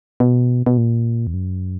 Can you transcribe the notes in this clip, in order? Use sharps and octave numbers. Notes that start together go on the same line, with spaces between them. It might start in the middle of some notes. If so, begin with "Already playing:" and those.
B2
B2
A#2
E2
F#2